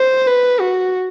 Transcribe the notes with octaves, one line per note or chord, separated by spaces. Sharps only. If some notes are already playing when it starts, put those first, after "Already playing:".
Already playing: C5
B4
F#4